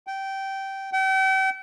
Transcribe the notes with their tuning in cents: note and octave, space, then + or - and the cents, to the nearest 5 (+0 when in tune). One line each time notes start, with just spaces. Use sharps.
G5 -15
G5 -40